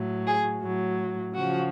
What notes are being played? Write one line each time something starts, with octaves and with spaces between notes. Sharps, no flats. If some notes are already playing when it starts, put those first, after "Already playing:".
Already playing: A2 F#3
G#4
A2 F#3
C#3 F3 F#4